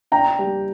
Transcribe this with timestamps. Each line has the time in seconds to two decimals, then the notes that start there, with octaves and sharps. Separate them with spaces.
0.12 D4 G5 A#5
0.39 G3